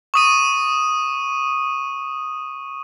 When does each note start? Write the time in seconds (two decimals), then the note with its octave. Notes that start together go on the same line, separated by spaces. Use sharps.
0.14 C#6 D#6 D#7